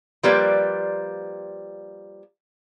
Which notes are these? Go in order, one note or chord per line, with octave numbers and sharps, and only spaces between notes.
F3 G3 A#3 B4 D5